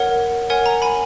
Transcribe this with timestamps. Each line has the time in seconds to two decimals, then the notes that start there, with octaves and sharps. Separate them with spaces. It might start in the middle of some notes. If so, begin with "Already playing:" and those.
Already playing: A#4 C#5 F#5
0.50 A#4 C#5 F#5 G#5
0.66 A#5
0.82 G#5 B5